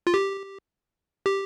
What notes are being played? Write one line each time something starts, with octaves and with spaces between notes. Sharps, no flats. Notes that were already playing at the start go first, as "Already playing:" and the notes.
F4
G4
G4